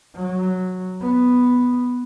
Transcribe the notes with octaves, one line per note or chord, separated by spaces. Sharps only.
F#3
B3